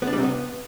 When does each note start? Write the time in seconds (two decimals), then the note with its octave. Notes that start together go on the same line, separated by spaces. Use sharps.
0.02 B3
0.07 D4
0.13 G3
0.18 C3
0.23 B3